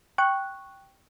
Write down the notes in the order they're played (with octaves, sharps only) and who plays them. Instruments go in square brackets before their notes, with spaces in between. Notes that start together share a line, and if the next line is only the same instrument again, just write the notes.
[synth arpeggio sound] G5 C#6 F#6